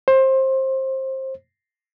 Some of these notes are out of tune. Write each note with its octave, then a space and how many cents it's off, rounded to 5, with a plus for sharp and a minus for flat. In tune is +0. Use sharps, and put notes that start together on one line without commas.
C5 +20